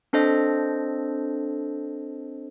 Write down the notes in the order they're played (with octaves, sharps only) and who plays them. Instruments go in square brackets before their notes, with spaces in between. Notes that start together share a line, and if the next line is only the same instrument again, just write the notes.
[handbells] C4 D4 A4 C5 D#5